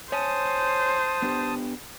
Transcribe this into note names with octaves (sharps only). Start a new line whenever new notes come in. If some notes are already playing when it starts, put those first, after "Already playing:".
C5 C#5 G#5 A5 D#6
B3 D4 G4